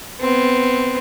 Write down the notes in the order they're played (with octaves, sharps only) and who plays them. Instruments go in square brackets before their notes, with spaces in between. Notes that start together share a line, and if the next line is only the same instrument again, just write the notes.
[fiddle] B3 C4